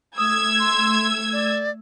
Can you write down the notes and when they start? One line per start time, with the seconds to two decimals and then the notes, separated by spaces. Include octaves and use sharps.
0.18 A3 D#6 E6 G#6
0.60 C6
1.33 D5